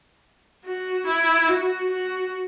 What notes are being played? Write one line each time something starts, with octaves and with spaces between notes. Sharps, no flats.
F#4
E4
F#4
F#4